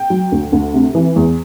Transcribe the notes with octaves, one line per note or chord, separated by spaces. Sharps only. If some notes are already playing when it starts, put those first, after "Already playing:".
Already playing: G5
F#3
D2
D2
C3
E3
E2